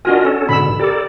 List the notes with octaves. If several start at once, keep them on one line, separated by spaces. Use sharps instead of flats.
D4 F4 F#4 A#4 D#5 G#5
C#4 A4
G#2 B2 D3 B5 E6
G4 A4 A#4 D5 D6